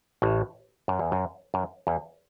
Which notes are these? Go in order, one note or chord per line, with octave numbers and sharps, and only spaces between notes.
A1 A2
F#2
E2
F#2
F#2
E2